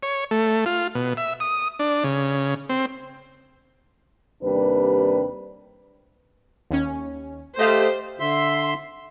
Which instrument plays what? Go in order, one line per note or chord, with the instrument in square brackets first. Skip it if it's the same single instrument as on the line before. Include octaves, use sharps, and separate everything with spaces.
[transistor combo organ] C#5
A3
F4
B2
E5
D#6
D4
C#3
C4
[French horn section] D#2 C3 G3 A#3 D4 B4
[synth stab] D#2 C#4
[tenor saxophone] A3 [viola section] G4 C5 [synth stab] D#5 F5
[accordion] D3 E5 C6